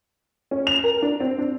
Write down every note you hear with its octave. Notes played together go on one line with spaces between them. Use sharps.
C#4
F7
A#4
D4
C4
D4